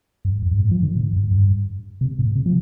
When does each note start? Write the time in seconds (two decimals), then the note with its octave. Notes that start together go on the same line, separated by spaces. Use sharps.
0.25 G2
0.42 F2
0.51 G2
0.60 A2
0.71 F3
0.83 D3
0.95 A2
1.13 G2
1.31 G2
2.01 C3
2.19 A2
2.36 C3
2.46 F3